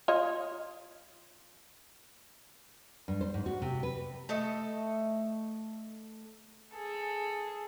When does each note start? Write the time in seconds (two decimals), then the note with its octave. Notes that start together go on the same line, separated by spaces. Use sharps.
0.08 F4 C#5 D#5
3.08 G2
3.21 C5
3.34 G#2
3.46 F#4
3.62 C3
3.83 B4
4.29 A3 A4 D#5
6.75 G#4 A4